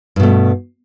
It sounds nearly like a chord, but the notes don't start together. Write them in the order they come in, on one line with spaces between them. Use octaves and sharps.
G2 B2 A3